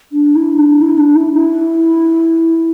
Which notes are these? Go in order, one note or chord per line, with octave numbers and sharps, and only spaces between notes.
D4
E4
D4
E4
D4
E4
E4